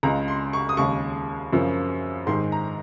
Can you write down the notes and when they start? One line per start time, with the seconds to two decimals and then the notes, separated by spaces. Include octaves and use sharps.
0.03 C#2 C#3 G#3 A#5
0.28 C6
0.53 C#6
0.69 D#6
0.77 D#2 C#3 G#3 C#6
1.52 F#2 C#3 F3 A#3
2.27 G#2 D#3 G#3 C6
2.52 A#5